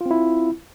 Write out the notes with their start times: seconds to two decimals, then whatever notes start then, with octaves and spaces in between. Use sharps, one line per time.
0.01 F4
0.06 C4
0.11 E4